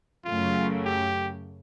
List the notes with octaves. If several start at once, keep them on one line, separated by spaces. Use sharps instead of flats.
F#2 C#3 F#3 A3 F4
G4